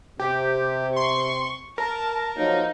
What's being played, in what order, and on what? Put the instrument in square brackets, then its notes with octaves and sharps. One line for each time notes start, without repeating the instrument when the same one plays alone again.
[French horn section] C3 [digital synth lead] G4
[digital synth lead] C6 [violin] C#6
[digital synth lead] A#4 [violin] A5
[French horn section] F3 F#3 A#3 [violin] D#4